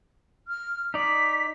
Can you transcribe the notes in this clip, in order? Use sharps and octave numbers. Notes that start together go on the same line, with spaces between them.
F6
D#4 D5 B6